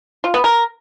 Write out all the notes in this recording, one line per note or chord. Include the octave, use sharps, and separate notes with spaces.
F4
B3
A#4